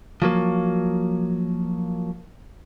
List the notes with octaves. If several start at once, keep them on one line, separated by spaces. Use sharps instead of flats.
F3 F#3 A#3